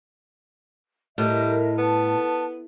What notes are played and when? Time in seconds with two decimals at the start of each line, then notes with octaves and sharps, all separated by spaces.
1.18 A2 G3 A#4 D#5 E5
1.78 B3 A5